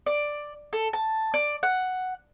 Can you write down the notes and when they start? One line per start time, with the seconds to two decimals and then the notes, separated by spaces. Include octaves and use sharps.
0.06 D5
0.73 A4
0.93 A5
1.34 D5
1.63 F#5